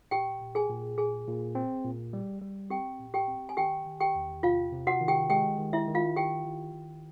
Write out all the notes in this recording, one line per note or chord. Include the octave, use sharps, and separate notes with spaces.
A#2 G4 G5
A#2
G#4 G#5
A#2
A#2 G#4 G#5
A#2
C4
A#2
G3
G3
C4 G4 G5
A#2
G4 G5
C4
G#5
D#3 G4 G5
D#3
G4 G5
E2
C3 F4 F5
C3
F#4 F#5
D#3
G4 G5
G#3 G4 G5
D#3
E4 E5
D#3
F4 F5
D#3 G4 G5
D#3
D#3